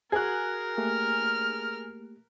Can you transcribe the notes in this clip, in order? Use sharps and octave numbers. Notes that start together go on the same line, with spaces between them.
F#4 G#4 A#4 F#6 G#6
A3 A#3 G4 F6